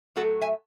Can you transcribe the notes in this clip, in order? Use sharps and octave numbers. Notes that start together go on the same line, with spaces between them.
A2 F#3 A3 F#4 A4
E5 G#5